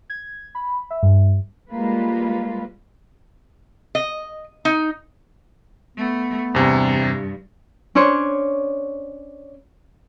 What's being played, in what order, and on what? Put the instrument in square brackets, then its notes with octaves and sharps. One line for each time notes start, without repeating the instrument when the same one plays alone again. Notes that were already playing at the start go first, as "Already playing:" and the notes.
[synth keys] G#6
B5
E5
G2
[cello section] G3 G#3 A#3 F4 B4
[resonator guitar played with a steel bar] D#5
D#4
[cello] A3 [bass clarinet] B3
[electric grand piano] E2 C3 [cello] G2
[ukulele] C#4 D4 C5 C#5